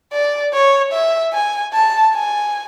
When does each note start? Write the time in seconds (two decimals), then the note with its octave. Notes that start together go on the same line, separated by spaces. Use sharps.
0.13 D5
0.54 C#5
0.93 E5
1.33 G#5
1.74 A5
2.14 G#5